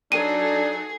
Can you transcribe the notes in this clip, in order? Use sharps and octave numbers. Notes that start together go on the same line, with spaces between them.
F#3 D4 D#4 G#4 A4 D#7